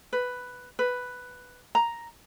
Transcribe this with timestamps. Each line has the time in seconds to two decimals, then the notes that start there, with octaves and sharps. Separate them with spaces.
0.13 B4
0.79 B4
1.75 A#5